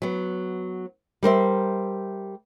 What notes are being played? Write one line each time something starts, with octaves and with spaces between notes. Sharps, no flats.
F#3 B3
G3 A#4 C5 E5